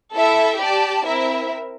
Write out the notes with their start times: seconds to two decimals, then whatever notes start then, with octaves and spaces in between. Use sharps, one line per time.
0.15 E4 A4 E5
0.60 G4 D5 A5
1.05 C4 E4 A#4 E5